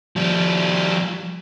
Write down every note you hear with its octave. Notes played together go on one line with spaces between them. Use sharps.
F3 G3